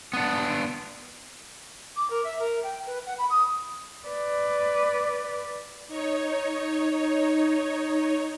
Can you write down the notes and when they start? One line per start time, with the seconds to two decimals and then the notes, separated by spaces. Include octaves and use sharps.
0.13 B3 D4
1.96 D6
2.10 A#4
2.24 E5
2.39 A#4
2.63 G5
2.86 B4
3.06 F#5
3.18 B5
3.30 D#6
4.06 B4 D5
5.88 D#4 C#5